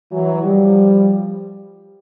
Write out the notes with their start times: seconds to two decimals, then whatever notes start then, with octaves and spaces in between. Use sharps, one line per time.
0.11 E3 F#3
0.43 F3 G3